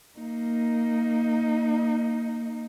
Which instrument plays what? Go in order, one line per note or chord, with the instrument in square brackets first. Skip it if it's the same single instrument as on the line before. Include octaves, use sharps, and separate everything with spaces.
[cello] A#3 D#4